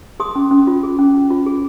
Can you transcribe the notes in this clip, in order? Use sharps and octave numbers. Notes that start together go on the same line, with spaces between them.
G#4 C6 D#6
C#4
C#4
F4
G#4
C#4
C#4
F4
G#4